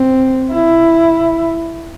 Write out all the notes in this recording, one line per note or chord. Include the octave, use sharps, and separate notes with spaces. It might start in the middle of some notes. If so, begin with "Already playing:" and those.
Already playing: C4
E4